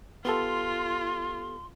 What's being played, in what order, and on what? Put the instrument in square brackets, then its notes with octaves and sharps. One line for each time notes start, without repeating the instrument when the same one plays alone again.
[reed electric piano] B3 G4 A4 [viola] F4 [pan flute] C6